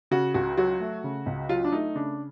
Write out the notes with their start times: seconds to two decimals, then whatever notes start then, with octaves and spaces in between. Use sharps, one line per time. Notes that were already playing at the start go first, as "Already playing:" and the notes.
0.11 C#3 F#4
0.34 C#2 F#4
0.57 F#3 F#4
0.80 A3
1.04 C#3
1.26 C#2
1.49 F#3 F4
1.64 D4
1.72 A3 D#4
1.95 C#3 D4